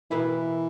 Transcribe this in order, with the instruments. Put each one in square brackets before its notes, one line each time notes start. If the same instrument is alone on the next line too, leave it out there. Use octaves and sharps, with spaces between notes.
[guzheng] B2 A#3 E4 B4 [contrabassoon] E3